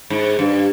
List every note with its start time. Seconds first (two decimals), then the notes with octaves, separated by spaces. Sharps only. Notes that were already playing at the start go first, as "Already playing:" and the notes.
0.10 G#2
0.39 G2